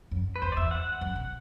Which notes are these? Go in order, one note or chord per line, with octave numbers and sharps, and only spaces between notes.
F#2
B4
E2 C5
D5
E2 E5
F#5
F#2
B2